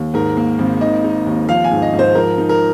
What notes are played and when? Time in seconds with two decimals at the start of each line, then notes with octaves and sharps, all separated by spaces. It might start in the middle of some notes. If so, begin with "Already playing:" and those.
Already playing: D#2
0.14 G#2 A#4
0.37 A#3
0.59 G#1
0.81 D#3 D#5
1.04 D#4
1.26 D#2
1.48 F3 F5
1.64 G#5
1.71 G#2
1.82 D#5
1.93 G#2
1.99 C5
2.15 F3 A#4
2.38 D#4
2.49 A#4